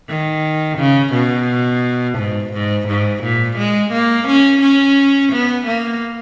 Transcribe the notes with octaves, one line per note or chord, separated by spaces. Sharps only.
D#3
C#3
B2
G#2
G#2
G#2
A#2
G#3
A#3
C#4
C#4
B3
A#3